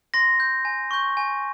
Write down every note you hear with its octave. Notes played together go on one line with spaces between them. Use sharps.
C6 A#6
G6
G#5
C#6 G6
G#5